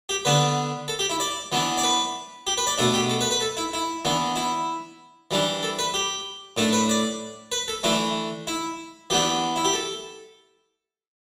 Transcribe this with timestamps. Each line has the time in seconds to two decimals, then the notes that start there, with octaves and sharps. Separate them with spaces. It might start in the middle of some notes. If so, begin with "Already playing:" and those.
0.09 G4
0.25 D3 B3 D4 B4
0.88 A4
0.99 G4
1.09 E4
1.20 D5
1.52 E3 B3 D4
1.78 D5
1.84 B4
2.47 G4
2.58 B4
2.67 D5
2.78 B2 A3 D4 A4
2.94 G4
3.09 A4
3.21 B4
3.31 B4
3.41 A4
3.57 E4
3.73 E4
4.05 E3 B3 D4
4.36 E4
5.31 E3 G3 D4
5.63 A4
5.79 B4
5.94 G4
6.57 A2 A3 D4 A4
6.73 B4
6.89 D5
7.52 B4
7.68 A4
7.83 E3 A3 D4 E4
8.47 E4
9.10 E3 B3 D4 G4
9.56 E4
9.65 G4
9.73 A4